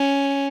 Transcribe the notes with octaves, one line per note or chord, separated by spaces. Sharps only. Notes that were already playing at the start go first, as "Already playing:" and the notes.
Already playing: C#4